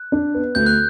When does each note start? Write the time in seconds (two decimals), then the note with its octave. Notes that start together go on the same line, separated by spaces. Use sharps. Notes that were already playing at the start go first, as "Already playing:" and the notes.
Already playing: F#6
0.12 D4
0.34 B3
0.55 D2 G6
0.66 F#6